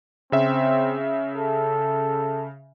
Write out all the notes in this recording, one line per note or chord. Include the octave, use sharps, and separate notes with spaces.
C#3 C4 E5
A4